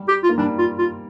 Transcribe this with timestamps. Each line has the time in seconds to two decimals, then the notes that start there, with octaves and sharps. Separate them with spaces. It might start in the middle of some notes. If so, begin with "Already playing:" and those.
Already playing: G3
0.08 G4
0.23 F4
0.29 A#3
0.38 G3 D4
0.58 F4
0.78 F4